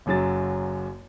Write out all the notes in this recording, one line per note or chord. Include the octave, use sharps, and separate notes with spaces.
F#1 F#2 F#3 A6